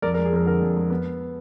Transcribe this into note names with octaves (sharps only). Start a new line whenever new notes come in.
F2 A#4 D5
A#4
G#3
G#4
F2 A#4
D3 A#4
F2
G#3
B3